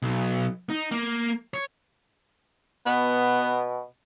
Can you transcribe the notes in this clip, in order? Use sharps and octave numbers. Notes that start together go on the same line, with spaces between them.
B1
D#4
A#3
C#5
B2 B3